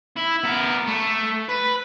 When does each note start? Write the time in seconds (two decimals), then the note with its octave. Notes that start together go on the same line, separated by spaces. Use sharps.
0.16 E4
0.44 B3 A#4
0.87 A3
1.49 B4